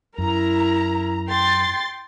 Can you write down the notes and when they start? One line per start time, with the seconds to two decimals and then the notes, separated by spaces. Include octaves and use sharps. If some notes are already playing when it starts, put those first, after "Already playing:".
0.18 F#2 E4 A#4 A#5
1.29 G5 C6 A6